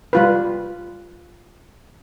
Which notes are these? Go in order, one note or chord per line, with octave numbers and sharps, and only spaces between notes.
G3 F4 B4